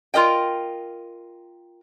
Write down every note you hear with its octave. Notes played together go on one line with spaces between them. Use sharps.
F4 A#4 D#5 G5